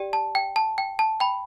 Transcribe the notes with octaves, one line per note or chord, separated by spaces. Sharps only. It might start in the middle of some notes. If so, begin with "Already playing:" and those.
Already playing: G4 D5 G5
A5
G5
A5
G5
A5
G5 B5